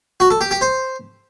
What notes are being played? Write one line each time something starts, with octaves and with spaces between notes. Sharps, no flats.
F#4
A4
G4
G4
C5